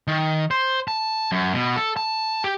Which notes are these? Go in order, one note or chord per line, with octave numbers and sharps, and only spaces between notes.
D#3
C5
A5
F#2
B2
A4
A5
G4